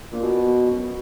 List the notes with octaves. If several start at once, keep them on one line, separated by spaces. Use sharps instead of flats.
A#2
B2
F#2